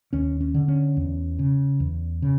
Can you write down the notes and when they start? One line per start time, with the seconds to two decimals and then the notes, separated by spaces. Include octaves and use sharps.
0.13 D#2 C#4
0.41 C#4
0.54 D3
0.68 C#4
0.97 E2
1.39 C#3
1.80 E2
2.22 C#3